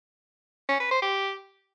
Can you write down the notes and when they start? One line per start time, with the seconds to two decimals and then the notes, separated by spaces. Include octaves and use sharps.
0.69 C#4
0.80 B4
0.91 C5
1.02 G4